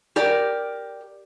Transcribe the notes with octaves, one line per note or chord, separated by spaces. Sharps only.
G4 A#4 D5